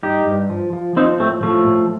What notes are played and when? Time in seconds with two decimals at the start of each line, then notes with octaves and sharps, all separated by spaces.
0.03 G2 D#4 G4
0.27 G2
0.50 F3
0.73 F3
0.96 F3 C4 D#4
1.19 A2 A3 C4
1.43 A2 F3 A3
1.67 A2